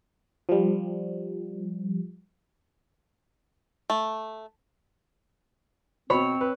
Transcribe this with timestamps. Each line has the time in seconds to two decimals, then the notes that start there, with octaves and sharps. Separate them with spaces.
0.49 F3 G3
3.90 A3
6.10 B2 C4 C#5 B5
6.41 B4